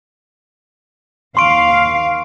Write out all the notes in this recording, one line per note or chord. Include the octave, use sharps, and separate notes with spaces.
D#2 F5 C6 C#6 D7